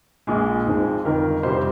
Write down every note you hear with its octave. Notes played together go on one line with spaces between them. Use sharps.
A#1 A#2 G#3 G#4
G#1 G#2 F3 G#3 C4
G1 F2 D#3 A#4
F2 C3 G3 C4 C5